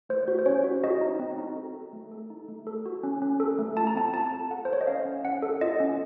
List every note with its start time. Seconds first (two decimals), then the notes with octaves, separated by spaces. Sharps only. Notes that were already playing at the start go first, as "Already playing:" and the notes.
0.09 A3 C5
0.28 F#4
0.39 C5
0.46 C#4 C#5
0.64 F#4
0.84 F#4 D#5
1.01 D#4
1.19 C4
1.38 D#4
1.56 A4
1.74 A4
1.93 A3
2.12 A4
2.30 D#4
2.48 A3
2.67 A4
2.86 F#4
3.03 C#4
3.22 C#4
3.40 A4
3.59 A3
3.77 F4 A5
3.87 A#5
3.95 C4 A5
4.14 F4 A5
4.32 A4
4.51 A4 F#5
4.65 C5
4.69 A4 C#5
4.81 D#5
4.87 C#4 F5
5.05 C#4
5.24 C#4 F#5
5.42 A4
5.61 F4 D#5
5.80 C#4